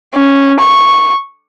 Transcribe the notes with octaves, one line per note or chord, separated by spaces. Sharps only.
C#4
C#6